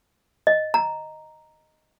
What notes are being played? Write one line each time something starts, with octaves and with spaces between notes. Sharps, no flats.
D#5
A#5